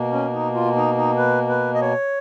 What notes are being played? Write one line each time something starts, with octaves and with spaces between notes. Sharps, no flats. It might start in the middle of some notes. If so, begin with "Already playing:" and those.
Already playing: B2 A#3
C#4
D#4
F4
D#4
D#4
B4
B4
D#5
C#5